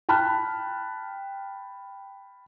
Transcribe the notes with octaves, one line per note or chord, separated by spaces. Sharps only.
G5 A5 B5 F6 F#6